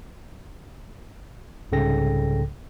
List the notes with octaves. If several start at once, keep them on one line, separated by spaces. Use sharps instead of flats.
C2 G#2 C#3 A4 G5 A#6